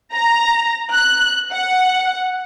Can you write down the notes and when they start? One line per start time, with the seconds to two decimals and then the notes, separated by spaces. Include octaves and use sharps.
0.15 A#5
0.91 F#6
1.52 F#5